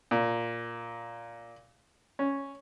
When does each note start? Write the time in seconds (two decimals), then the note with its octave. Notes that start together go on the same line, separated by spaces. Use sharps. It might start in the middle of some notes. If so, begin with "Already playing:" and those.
0.11 A#2
2.19 C#4